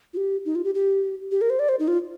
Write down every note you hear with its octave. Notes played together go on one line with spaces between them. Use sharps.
F4
G4
D#4
F4
G4
G4
G4
A#4
C5
D5
C5
D#4
F4